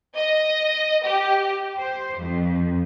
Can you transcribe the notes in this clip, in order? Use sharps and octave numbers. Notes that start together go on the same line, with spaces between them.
D#5
G4
C5
F2